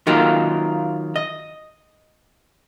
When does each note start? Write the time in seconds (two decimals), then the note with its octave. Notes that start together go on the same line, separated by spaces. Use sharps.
0.07 D#3 F#3 A#3 D#4 F4
1.16 D#5